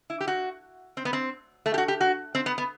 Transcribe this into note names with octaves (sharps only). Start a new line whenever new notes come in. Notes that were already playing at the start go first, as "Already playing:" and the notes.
E4
G4
F#4
C4
B3
C4
A3
G4
F#4
G4
F#4
C4
B3
B3